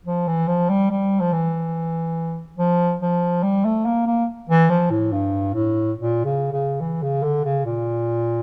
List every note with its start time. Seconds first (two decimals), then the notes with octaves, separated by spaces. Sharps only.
0.05 F3
0.27 E3
0.48 F3
0.70 G3
0.91 G3
1.20 F3
1.33 E3
2.58 F3
3.02 F3
3.43 G3
3.65 A3
3.86 A#3
4.06 A#3
4.50 E3
4.70 F3
4.91 A2
5.12 G2
5.54 A2
5.97 A#2
6.25 C#3
6.53 C#3
6.81 E3
7.03 C#3
7.23 D3
7.44 C#3
7.66 A#2